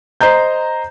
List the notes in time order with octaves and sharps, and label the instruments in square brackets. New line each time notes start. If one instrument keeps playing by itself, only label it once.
[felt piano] C5 D#5 A#5 G6